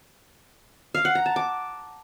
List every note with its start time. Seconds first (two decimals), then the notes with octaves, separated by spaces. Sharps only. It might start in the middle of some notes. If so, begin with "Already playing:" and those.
0.94 F5
1.05 F#5
1.15 A#5
1.26 A5
1.36 D6